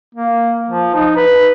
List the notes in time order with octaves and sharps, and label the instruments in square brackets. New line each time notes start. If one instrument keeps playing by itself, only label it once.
[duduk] A#3
F3
D#4
B4